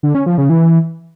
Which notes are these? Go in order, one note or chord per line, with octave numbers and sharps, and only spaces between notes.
D3
C#4
F3
C#3
E3